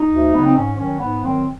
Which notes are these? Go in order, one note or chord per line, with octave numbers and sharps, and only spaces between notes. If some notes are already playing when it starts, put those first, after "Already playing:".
Already playing: D#4
D2
C#3 F#3 B3
C4
G#2 C#4
D#3 F#3 C#4
G#2 B3
D#3 F#3 C4